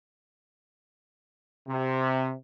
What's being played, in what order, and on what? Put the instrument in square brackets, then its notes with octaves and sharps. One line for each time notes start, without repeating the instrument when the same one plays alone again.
[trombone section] C3